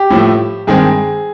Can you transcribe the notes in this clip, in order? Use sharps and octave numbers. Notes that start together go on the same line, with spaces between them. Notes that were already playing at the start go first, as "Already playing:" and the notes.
Already playing: G4
A2 F3 A3
G2 D#3 G#3 C4 G#4